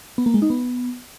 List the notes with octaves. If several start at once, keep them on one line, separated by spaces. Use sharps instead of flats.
B3
A#3
G#3
D#4
B3